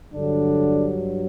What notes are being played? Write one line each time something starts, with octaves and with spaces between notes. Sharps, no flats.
G2 D3 F#3 D4